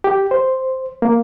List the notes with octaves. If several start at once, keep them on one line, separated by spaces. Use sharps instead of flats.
G4
C5
A#3